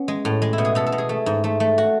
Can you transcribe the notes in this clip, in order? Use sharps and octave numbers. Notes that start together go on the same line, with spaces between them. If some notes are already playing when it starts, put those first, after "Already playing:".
Already playing: B3 C#4
G#3
A2
G#3
E4
B2
G#4
B2 A4
A4
B2
G#4
A3
G#2
A3
A3
F#4